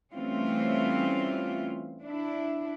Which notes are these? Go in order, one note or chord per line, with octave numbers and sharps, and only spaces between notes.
E3 G3 A3 C4 C#4 F4
D4 E4